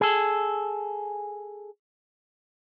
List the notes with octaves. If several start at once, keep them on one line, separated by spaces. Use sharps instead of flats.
G#4 A4